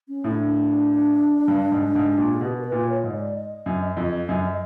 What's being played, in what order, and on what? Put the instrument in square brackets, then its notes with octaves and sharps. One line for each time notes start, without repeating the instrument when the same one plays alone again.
[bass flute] C#4
[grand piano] A2
[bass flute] D4
[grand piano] G2
G#2
G#2
A#2
[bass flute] G#4
[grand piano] B2 [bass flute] G4
[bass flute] A#4
B4
[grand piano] A#2
[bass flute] C#5
[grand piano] G#2
[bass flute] D5
D#5
[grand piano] F#2
F2
F#2